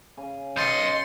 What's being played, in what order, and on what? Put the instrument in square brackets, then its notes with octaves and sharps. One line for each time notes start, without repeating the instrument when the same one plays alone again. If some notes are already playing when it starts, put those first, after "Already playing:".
[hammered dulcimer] C#3 G#5
[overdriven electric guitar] B1 D#5 [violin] C6 [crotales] G6 A6 C#7